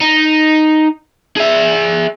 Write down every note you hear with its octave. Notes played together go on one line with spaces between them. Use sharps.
D#4
G#4 E5